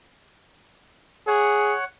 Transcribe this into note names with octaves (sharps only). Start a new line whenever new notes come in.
G#4 C#5 F#5